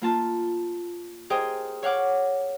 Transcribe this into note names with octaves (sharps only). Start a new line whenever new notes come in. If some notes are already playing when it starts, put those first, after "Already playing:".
A#3 F4 A5
G4 G#4 A#4 C5 D#5 G5
C#5 F5 F#5 D6